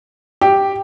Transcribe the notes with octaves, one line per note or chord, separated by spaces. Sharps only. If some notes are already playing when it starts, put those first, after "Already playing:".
G4